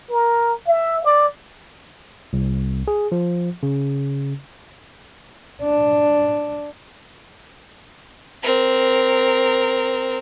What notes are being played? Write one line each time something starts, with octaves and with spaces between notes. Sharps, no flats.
A#4
E5
D5
C2
G#4
F3
C#3
D4
C4 A#4